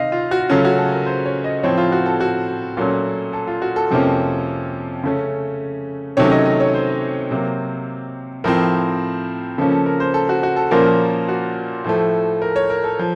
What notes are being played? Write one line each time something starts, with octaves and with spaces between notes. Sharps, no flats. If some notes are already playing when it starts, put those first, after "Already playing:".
Already playing: C3 D#3 C4 D#5 F5
F4
F#4
C#3 F#3 A3 C#4 F4
F#4
A4
A#4
C5
C#5
D#5
A2 F3 C4 C#5
F4
F#4
A4
F#4
A#2 F#3 A3 C#4
A4
F4
F#4
A4
F2 C3 F3 A#3 C#4
C#3 A3 C#4
C3 D#3 F#3 A3 C#4 C#5
D#5
D#5
C#5
C5
C3 F#3 A#3
A2 F3 C4 A#4
C#3 F3 A#3 C#4 A4
A4
A#4
C5
A4
F#4
F#4
A4
A#2 F3 A#3 C#4 A#4
F#4
A2 F3 A3
A#4
C#5
A#4
A4
F3